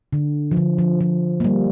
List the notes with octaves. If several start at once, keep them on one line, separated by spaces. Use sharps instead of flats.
D3
F3
D3
F3
F3
A#3
G3